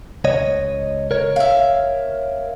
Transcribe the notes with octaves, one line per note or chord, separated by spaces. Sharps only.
C#2 C#5 D#5
A#4 C#5
E5 F5